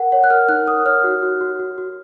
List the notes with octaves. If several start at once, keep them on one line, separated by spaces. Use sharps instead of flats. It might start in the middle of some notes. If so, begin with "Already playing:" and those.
Already playing: A#4 F#5
C#5 F#5
F#6
A#4 F6
D#4 F#6
A#4 D#6
C#5 F6
F#4
F#4
F#4
F#4
F#4